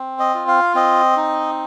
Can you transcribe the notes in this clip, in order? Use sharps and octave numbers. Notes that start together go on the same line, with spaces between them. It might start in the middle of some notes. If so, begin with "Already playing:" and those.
Already playing: C4
D#5
F4
F5
C4 D#5
D#4